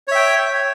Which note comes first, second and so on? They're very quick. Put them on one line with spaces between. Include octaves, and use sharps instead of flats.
C#5 E5 G5